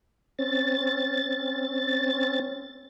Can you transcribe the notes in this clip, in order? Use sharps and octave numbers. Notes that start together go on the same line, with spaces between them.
C4 C#4 A6